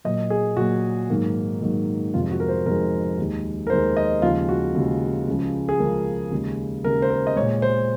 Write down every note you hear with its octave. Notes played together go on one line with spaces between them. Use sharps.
A#2 F#3 A#3 D#5
G#4
A#2 F#3 A#3 F#4
G#2 D#3 F#3 A#3
G#2 D#3 F#3 A#3
F2 C3 D#3 G#3 F4
F#4
A#4
C5
F2 C3 D#3 G#3 A#4
D#2 D#3 G#3
A#4
D#2 D#3 G#3 C5
D#5
D#2 C#3 F3 G#3 F4
F#4
D#2 C#3 F3 G#3
C#2 C#3 F3 G#3
G#4
C#2 C#3 F3 G#3 A#4
D#2 C#3 G#3
D#2 C#3 G#3 A#4
C5
A#4
D#5
A#2 G#3 C#5
C5